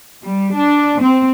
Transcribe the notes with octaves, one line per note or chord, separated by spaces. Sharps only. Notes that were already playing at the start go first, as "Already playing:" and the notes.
G3
D4
C4